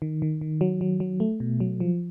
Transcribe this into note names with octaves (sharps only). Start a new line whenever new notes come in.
D#3
D#3
D#3
F#3
F#3
F#3
A3
B2
F#3
F3